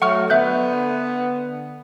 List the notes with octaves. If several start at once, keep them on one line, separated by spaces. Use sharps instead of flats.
F#3 A3 F#5 C#6 F6
D3 B3 E5 F#6 G6